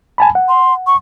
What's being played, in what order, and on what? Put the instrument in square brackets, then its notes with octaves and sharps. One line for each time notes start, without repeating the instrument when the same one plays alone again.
[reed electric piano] G#5 A5 B5
F#5
[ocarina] C6
C#6